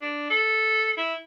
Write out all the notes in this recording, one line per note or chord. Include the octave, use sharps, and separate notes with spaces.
D4
A4
E4